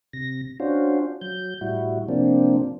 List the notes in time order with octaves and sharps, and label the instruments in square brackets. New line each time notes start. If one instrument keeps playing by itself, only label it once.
[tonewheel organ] C3 A#6
C#4 D4 F4 F#4 C5
F#3 G6
A2 G3 E4 F#4
C3 F3 A#3 C4 D4